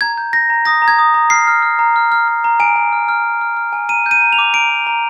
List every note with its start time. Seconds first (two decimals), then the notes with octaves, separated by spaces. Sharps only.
0.01 A#5 G#6
0.18 G6
0.33 G6 A#6
0.50 A#5
0.65 D#6 A#6
0.82 A#5
0.88 G#6
0.99 D#6
1.14 A#5
1.30 F6 C7
1.47 F6
1.62 F6
1.79 A#5
1.96 F6
2.12 F6
2.28 F6
2.44 A#5
2.60 G#5 D7
2.76 G#5
2.92 F6
3.09 F6
3.24 G#5
3.41 F6
3.57 F6
3.73 G#5
3.89 A#5 D#7
4.06 G6
4.11 D#7
4.21 A#5
4.33 F7
4.38 D6
4.53 A#5 D7
4.70 A#5
4.87 A#5